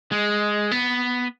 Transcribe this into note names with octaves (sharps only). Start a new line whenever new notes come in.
G#3
B3